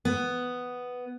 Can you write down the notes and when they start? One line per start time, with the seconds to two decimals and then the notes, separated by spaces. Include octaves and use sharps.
0.05 B3